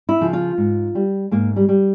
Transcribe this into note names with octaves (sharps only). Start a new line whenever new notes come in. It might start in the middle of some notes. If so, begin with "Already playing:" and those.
E4
C#3 F3
F4
G#2
G3
G#2 A#3
G3
G3